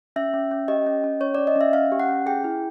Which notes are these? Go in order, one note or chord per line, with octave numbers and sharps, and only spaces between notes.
C#4 E5
C#4
C#4
G4 D#5
C#4
C#4
C#4 C#5
C#4 D5
D#5
C#4 E5
C#4 F5
G4
F#5
C#4
G#4 G5
E4